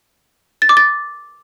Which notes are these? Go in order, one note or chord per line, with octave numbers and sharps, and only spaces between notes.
A6
D6
A6